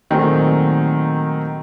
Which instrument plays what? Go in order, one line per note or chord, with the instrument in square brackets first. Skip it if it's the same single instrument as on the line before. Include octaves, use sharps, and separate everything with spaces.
[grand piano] A#2 D#3 F#3 A3 C4 G#4